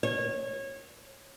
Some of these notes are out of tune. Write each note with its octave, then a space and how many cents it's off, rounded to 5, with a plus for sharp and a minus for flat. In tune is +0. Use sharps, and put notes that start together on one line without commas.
C#5 -25